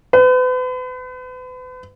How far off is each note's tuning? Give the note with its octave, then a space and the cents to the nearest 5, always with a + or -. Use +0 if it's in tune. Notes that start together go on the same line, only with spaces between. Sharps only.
B4 +40